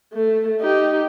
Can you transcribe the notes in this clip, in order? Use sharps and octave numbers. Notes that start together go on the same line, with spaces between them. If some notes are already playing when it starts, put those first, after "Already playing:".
A3
D#4 G4